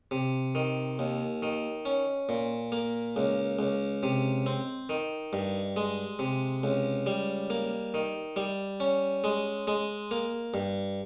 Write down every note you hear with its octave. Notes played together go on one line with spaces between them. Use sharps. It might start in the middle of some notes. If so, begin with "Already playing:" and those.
C3
D#3
D#2
D#3
C#4
A#2
A#3
C#2
C#2
C3
C4
D#3
G2
G#3
C3
C#2
G3
A#3
D#3
G3
C#4
G#3
G#3
A#3
G2